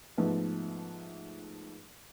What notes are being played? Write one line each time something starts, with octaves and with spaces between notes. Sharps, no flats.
G#2 F3 A3 B3